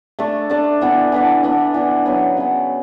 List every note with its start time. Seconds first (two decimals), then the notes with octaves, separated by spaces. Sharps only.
0.19 A3 D4 A4
0.50 A3 D4 A4
0.81 E3 B3 D4
1.12 E3 B3 D4
1.43 E3 B3 D4
1.74 E3 B3 D4
2.06 C#3 F#3 B3
2.37 C#3 F#3 B3